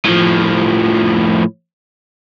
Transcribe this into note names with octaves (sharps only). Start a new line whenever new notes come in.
A2 F3